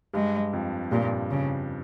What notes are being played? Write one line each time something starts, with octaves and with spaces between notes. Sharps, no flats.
G2 G#3
F2
G2 A#2
C#3